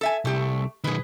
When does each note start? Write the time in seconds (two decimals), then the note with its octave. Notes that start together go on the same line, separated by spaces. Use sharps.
0.01 A4 E5 G#5
0.25 C2 A3 G4
0.84 B1 D#3 G#4 B4